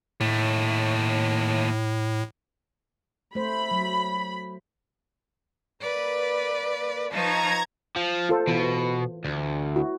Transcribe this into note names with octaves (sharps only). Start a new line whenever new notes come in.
D#2 A2 A3
A3 C5 B5
F#3
A#3 B4 D5
F3 D#4 B4 A5 A#5 C#6 G#6
F3
F4 A4 C5
B2 E3
D2
E4 F#4